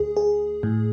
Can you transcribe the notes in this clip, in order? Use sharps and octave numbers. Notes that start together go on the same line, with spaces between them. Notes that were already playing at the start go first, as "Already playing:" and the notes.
Already playing: D2 G#4
G#4
A2